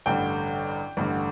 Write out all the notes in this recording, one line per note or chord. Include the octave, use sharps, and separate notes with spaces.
A1 G2 D3 G5
A1 G2 D3